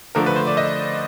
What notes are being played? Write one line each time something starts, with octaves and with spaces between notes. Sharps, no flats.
D3 F3 A3 A#4
B4
C5
D5
D#5